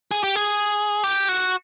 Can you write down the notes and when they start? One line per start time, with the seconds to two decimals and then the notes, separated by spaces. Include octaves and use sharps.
0.11 G#4
0.24 G4
0.36 G#4
1.04 G4
1.29 F#4